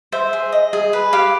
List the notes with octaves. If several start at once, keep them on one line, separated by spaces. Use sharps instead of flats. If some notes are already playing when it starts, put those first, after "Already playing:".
C5 E5
G#4
D#5
G#4
B4
G4 F5